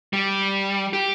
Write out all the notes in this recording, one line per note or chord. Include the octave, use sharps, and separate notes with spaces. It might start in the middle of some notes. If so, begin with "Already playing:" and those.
G3
G4